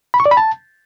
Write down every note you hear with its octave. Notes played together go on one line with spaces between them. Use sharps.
B5
C#6
D5
B5
A5